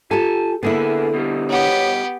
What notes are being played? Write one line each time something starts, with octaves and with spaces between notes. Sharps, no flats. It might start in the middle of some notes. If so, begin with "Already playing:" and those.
F4 G4 A4 G#5 A5
D3 A#3 B3 E4 G#4 A4
B2 G3
B3 G4 C#5